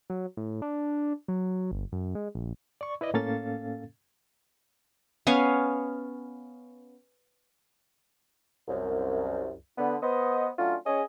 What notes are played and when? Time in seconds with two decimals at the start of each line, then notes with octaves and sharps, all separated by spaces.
0.10 F#3
0.37 A2
0.62 D4
1.28 F#3
1.71 G1
1.92 F#2
2.15 G#3
2.35 A#1
2.81 D5 C#6
3.01 E4 B4 D5 D#5
3.14 A2 A#3 C#4 A4 F5 A6
5.27 B3 C#4 F5 G#5
8.68 C2 F#2
9.77 D3 B3
10.01 B3 C5 D#5
10.58 F#3 A3 C#4 D4 F4
10.85 C#4 G#4 D#5